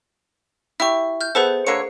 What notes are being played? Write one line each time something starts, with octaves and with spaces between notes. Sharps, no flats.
E4 G4 E5 C#6
F6 G6
B3 G#4 A4 B4 C5
D3 A#3 C#5 C7 C#7